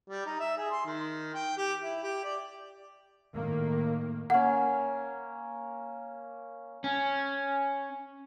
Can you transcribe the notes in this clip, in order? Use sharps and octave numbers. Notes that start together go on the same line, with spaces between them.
G3
D#4
E5
G#4
C6
D#3
G5
G4
E4
G4
D5
A2 D#3 A#3
A#3 C#4 F#5
C#4